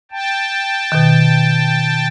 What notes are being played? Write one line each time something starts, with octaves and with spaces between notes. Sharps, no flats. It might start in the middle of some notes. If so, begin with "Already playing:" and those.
G5 A5
B2 D#3